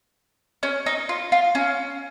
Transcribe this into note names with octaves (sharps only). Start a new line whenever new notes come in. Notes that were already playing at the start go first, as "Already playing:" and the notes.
C#4
D#4
F4
F4
C#4